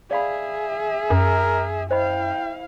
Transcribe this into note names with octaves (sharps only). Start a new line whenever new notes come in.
G#4 D5 E5 F5 B5
F#2 A#4
E4 C5 D#5 F5 G5 B5